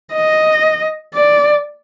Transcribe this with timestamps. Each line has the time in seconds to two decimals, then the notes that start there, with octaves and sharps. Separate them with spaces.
0.12 D#5
1.14 D5